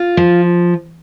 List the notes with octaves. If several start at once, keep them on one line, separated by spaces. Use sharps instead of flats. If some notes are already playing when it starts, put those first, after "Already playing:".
Already playing: F4
F3